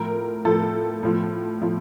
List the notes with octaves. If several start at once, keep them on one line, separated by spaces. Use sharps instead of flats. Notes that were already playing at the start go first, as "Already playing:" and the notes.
Already playing: A2 F3 A#4
A2 F3 A4
A2 F3
A2 F3